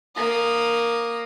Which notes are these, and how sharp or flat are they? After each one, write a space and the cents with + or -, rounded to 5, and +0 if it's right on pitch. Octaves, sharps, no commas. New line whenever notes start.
A#3 +0 D#6 -15